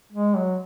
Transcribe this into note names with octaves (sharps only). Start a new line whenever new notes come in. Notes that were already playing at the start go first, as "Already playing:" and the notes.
G#3
F#3